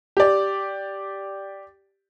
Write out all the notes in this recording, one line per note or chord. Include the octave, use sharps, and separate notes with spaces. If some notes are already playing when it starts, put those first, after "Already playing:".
G4 D5